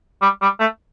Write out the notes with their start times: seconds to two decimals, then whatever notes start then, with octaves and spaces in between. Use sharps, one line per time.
0.22 G3
0.42 G3
0.60 A3